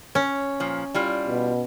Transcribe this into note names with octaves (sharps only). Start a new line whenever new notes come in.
C#4
A#2 F3
G3 E4 F4
B2